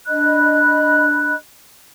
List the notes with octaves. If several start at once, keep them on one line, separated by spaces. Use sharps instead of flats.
D4 D#5 B5 F#6